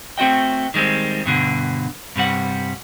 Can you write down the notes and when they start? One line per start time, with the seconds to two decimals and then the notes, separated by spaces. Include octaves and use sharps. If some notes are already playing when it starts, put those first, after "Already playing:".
0.18 A3 C4 F#4 D#5 G5
0.74 D#3 G3 G#3 A#3 C4
1.25 G2 B2 D3
2.16 G2 C3 G3 F#5